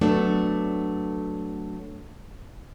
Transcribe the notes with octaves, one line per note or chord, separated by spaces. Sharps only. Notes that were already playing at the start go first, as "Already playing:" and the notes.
F#3 A3 B3 D4